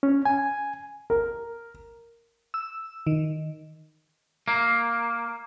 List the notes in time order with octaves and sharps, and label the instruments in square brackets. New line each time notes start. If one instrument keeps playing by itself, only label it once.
[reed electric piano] C#4
G#5
[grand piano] A#4
[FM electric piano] E6
D#3
[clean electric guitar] A#3